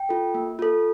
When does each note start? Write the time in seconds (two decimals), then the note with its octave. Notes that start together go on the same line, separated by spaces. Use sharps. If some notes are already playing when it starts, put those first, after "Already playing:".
Already playing: G5
0.09 F4 A4
0.34 A#3
0.59 F4 A4